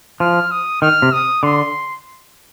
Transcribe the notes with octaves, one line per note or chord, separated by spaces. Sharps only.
F3 F6
D#6
D#3 F6
C3
D#6
D3 C6